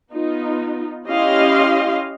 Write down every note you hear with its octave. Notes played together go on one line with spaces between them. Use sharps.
B3 D#4 F4
C#4 E4 G4 D#5 F5 C6